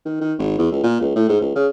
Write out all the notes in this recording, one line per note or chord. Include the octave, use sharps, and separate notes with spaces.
D#3
D#3
G#1
E2
C#2
A#2
C#2
A2
G#2
C#2
C#3